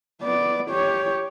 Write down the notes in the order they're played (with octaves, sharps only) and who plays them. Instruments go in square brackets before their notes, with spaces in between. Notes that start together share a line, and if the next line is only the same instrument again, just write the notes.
[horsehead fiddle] B3 D5
G4 C#5